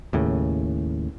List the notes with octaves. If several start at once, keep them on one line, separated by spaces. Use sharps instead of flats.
D#2 A2 C#3